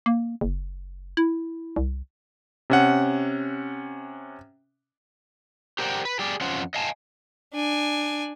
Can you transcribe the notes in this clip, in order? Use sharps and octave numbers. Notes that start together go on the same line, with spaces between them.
A#3
F#1
E4
C2
C3 C#4 F#5
G4 A#4 C5 D5 F#5 G5
B4
G4 G#4 D5
F2 C#4 F4 C5 F#5
D#5 F5 G#5 A5
D4 G#5